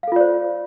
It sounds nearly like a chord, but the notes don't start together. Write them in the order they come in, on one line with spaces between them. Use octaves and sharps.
F5 A4 F4 D5 C5